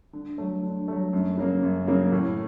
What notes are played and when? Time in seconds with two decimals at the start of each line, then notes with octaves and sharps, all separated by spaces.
0.13 D3
0.38 F#3 A3
0.63 D3
0.88 F#3 A3
1.13 F#2
1.38 C#3 F#3 A#3
1.63 F#2
1.88 C#3 F#3 A#3
2.12 A2